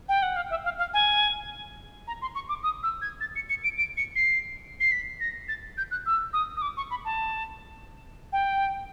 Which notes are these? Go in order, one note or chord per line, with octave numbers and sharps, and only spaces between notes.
G5
F#5
F5
E5
F5
F5
G#5
A#5
C6
C#6
D6
D#6
E6
G#6
A6
C#7
C#7
D7
D7
C#7
C7
C7
B6
A#6
A6
G6
F#6
E6
D#6
D#6
D6
C#6
B5
A5
G5